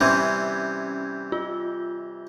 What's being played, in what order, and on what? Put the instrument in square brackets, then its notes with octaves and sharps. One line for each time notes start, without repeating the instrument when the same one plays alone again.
[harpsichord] C3 E3 G3 [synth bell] C#4 G6 G#6
[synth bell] F4